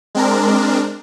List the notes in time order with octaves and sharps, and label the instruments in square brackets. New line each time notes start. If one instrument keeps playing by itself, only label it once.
[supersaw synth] G#3 C4 D4 A#4